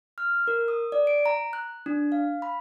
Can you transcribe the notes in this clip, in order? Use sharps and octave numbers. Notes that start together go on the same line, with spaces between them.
F6
A#4
D#6
D5
D7
A#5
F#6
D4
F5
B5